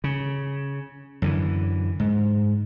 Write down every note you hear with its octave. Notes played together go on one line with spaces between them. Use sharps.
C#3
F#2 D3 E3
G#2